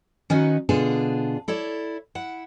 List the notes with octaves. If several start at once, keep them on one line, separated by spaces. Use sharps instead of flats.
D#3 C#4 D#4 F#4 B4 D#5
B2 D3 B3 D4 F4 G#4
E4 A4 C#5 D5
E4 F#5